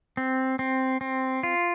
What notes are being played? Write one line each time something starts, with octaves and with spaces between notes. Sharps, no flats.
C4
C4
C4
F4